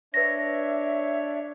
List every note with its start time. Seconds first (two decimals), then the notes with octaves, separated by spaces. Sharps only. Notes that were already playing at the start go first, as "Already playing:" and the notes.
0.14 D4 B4 C#5 E5 A#6